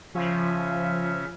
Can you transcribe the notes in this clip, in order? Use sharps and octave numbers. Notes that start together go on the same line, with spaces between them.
C#3 F3 C#4 E5